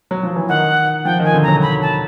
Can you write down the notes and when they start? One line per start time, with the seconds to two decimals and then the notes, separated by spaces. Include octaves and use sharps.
0.11 F#3
0.23 F3
0.36 E3
0.49 D#3 F#5
1.05 F3 G5
1.20 D#3 G#5
1.34 D3
1.43 F#3 A#5
1.62 B5
1.82 A5